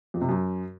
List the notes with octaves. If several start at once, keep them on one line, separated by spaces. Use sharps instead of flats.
F2
C3
F#2